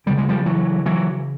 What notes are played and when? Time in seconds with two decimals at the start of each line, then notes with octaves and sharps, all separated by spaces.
0.06 D2 C#3 G3
0.18 G#3
0.29 F3 G3
0.46 E3 F#3
0.86 E3 F#3